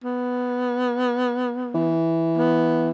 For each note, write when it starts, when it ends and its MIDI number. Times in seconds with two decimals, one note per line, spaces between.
0.04 1.95 59
1.74 2.91 52
2.38 2.91 59